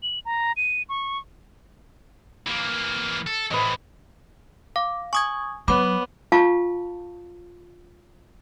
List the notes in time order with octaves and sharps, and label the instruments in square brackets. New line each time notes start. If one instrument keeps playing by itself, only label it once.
[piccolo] F#7
A#5
D#7
C#6
[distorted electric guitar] E3 A#3
A4
[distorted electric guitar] A2 E3 [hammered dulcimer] B4 D#5
[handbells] F5 [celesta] D6
[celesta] G#5 [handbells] C#6 D#6 G#6
[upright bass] F#3 [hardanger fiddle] B3 [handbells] C#5 B5 [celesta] D6
[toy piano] F4 F5 A5 C#6